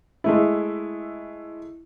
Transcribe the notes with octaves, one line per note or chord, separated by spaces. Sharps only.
G#3 A3 E4